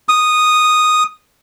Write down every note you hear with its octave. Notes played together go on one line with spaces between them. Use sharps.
D#6